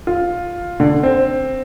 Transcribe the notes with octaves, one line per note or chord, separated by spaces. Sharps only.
F4
D3
C4